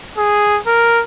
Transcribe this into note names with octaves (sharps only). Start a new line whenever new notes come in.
G#4
A#4